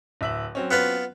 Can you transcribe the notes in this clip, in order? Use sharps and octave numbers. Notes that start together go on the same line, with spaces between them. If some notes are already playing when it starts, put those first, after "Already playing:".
D1 E5 F#7
F#3 C4 C#4
B3 F4 B4